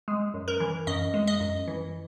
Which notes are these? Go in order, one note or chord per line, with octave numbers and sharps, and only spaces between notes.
G#3
F#2
A#4
E3
F#2 D#5
G#3
D#5
F#2
E3